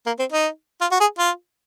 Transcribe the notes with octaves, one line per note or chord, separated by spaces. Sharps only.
A#3
C4
D#4
F4
F#4
G#4
F4